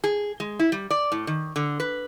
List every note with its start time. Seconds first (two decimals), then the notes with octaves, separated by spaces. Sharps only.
0.04 G#4
0.40 G#3
0.59 E4
0.72 G3
0.90 D5
1.12 A2
1.27 D#3
1.56 D3
1.80 B4